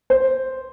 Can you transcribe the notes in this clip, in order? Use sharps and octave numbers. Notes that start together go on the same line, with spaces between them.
C5